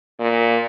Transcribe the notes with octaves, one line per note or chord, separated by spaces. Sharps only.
A#2